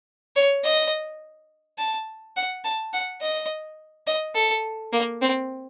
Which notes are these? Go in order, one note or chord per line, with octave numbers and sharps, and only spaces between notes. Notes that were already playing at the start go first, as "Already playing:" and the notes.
C#5
D#5
A5
F#5
A5
F#5
D#5
D#5
A4
A#3
C4